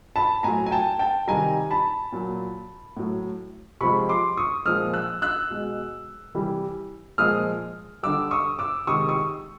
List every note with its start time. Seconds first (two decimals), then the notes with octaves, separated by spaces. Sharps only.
0.16 A5 B5
0.43 A2 F#3 G#5 A#5
0.66 G#5
0.71 G5 A5
0.99 G5 A5
1.28 C3 D#3 G3 G#5 A#5
1.70 A5 B5
2.12 A#2 F#3
2.97 A2 F#3
3.81 C3 F3 G#3 B5 C#6
4.09 C6 D6
4.37 C#6 D#6
4.66 A#2 F3 G#3 D#6 F6
4.94 E6 F#6
5.22 E6 F#6
5.50 B2 G#3
6.35 C3 E3 G3
7.18 A#2 F3 G#3 D#6 F6
8.03 D3 G3 D6 E6
8.31 C#6 D#6
8.59 D6 E6
8.87 C3 D#3 G#3 C#6 D#6
9.09 C#6 D#6